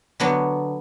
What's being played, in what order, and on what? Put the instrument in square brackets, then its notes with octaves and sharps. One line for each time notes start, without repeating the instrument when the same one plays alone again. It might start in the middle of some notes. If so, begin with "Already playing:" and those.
[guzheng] D3 F#3 B3 D4